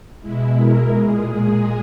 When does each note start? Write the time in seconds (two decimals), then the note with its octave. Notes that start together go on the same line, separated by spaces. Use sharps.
0.21 B2 G#3 E4
0.55 A#4
0.89 A#2 G#3 G#4